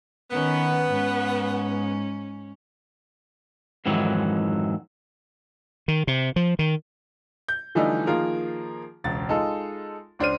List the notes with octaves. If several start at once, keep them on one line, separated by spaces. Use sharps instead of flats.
D#3 B3 C#4
G#2 C#4
F2 G#2 D#3 E3 F#3
D#3
C3
F3
D#3
G6
D3 E3 F3 G3 A3 D#4
D#3 F3 A#3 F4 G#4 A#4
E1 C#2 A6
G#3 D#4 F4 A4
C#2 D4 C5 F6 D#7